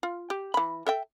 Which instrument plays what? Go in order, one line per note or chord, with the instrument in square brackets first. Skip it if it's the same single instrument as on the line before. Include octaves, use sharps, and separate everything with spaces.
[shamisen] F4
G4
E3 B5
A4 E5 G5